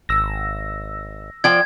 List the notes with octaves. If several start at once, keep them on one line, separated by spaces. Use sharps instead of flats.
G#1 E6 A#6
F3 D5 G5 G#6